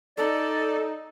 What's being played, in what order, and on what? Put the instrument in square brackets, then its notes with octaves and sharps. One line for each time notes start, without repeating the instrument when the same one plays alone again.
[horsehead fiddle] D#4 [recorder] A4 [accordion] D5